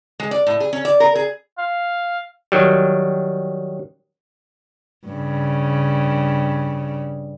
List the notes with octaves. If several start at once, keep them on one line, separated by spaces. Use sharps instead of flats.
G#3
D5
A2
G#4
C#4
D5
A#4
G#4
F5
D#3 F#3 G3
G2 C#3